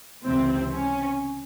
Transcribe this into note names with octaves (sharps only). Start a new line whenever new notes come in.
C#2 C3 E3 C4
C#4